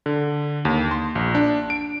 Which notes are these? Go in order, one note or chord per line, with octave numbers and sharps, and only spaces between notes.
D3
D#2
C6
A#1
D4
D7